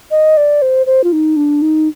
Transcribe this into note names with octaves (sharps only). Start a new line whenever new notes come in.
D#5
D5
C5
C5
F4
D#4
D4
D#4